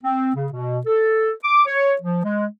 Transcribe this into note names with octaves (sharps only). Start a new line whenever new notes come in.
C4
C#3
B2
A4
D6
C#5
F3
G#3